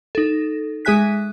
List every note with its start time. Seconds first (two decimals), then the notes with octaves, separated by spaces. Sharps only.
0.15 D#4 A4
0.85 G#3 G#4 E5 G#5 F#6 B6